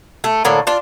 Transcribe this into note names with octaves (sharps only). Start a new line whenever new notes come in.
A3
A2 D3 A#3
D4 F4